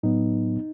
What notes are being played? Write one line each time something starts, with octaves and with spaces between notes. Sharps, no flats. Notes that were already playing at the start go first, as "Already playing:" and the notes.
A2 F#3 B3 D#4